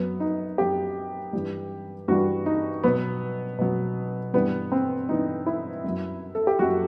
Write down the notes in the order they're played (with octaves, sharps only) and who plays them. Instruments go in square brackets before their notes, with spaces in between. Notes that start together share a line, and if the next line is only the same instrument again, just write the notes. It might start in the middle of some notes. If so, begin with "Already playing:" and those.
Already playing: [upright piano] F#2 F#3 B3
D#4
F#2 F#3 G4
G2 E3 G3
G2 E3 G3 F#4
D#4
B2 F#3 B3
B2 F#3
G2 E3 G3 B3
C4
G2 E3 G3 D#4
E4
F#2 F#3
A4
G4
F#2 F#3 F#4